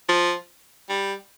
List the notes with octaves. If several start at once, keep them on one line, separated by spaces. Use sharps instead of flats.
F3
G3